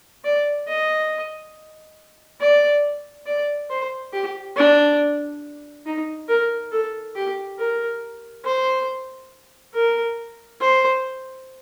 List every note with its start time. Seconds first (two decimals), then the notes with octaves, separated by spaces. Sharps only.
0.25 D5
0.68 D#5
2.41 D5
3.27 D5
3.70 C5
4.13 G4
4.56 D4
5.86 D#4
6.29 A#4
6.72 A4
7.15 G4
7.59 A#4
8.45 C5
9.74 A#4
10.61 C5